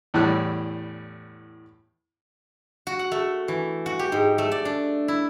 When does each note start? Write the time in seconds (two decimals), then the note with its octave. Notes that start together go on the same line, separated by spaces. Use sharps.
0.14 E2 A2 E3 G3 F#6
2.87 F#4
2.99 F#5
3.12 A3
3.48 E3
3.86 F#4
3.99 G4
4.12 G#2
4.38 A3
4.52 D5
4.65 D4
5.08 E4